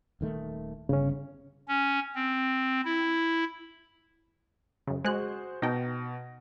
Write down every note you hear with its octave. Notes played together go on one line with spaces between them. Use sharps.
D#1 D#3 A3
G1 C#3 C#4
C#4
C4
E4
F#2 C#3
G#3 F#4 G#4 C5 F#6
B2 D#4 G5 A5 A#6